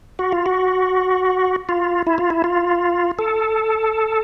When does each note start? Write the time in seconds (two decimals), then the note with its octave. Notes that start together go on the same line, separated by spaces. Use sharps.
0.19 F#4
0.32 F4
0.46 F#4
1.69 F4
2.07 E4
2.18 F4
2.30 E4
2.44 F4
3.19 A4